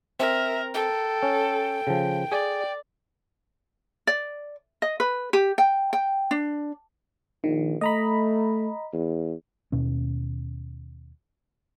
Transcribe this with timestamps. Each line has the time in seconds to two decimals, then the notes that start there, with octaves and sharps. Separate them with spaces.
0.20 C4 A#4 E5
0.74 A4 G5
1.23 C#4
1.87 C#3 F3
2.32 G#4 D5
4.07 D5
4.82 D#5
5.00 B4
5.33 G4
5.58 G5
5.93 G5
6.31 D4
7.44 A#1 D#3
7.81 A3 D#5 A#5 B5
8.93 E2
9.72 D#2 B2 C#4